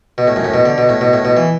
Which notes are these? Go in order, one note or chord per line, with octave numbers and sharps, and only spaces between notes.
B2
A2
F#2
A2
B2
D3
B2
A2
B2
A2
B2
E3